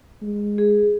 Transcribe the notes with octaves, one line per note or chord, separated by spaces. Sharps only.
G#3
G#4